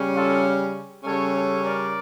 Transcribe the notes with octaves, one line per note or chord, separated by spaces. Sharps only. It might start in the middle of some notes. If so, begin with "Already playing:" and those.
Already playing: C#3 G3 C#4
F4 A4
C#3 G3 C#4 A4 C#5
A4 C#5
A#4 D5